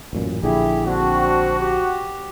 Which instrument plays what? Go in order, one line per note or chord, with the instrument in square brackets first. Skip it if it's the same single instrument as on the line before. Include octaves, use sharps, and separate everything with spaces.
[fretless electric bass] A1 F#2 A#2
[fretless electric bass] A#1 D3 [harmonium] E4 G4 G#4
[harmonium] C4 D4 [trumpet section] F#4
[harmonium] G4